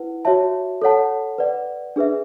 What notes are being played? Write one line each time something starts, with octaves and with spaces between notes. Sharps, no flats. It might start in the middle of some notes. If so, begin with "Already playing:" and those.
Already playing: E4 B4 F#5
F#4 C#5 E5 A5
A4 C#5 F#5 A5
B4 D5 F#5
D4 G#4 B4 E5